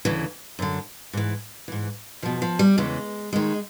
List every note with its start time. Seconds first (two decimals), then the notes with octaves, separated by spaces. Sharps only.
0.05 D2 C#3 E3
0.59 F#2 D3
1.13 G#2 E3
1.68 G#2 E3
2.22 E2 B2 F3
2.42 F3
2.59 G3
2.78 E2 C#3 E3 G#3
3.33 D#2 D#3 G#3